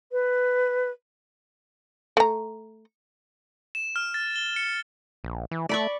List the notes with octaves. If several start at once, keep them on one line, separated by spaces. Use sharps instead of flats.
B4
A3 A#5
E7
F6
A6
G7
C#7
A#1
E3
A3 D5 B5 C#6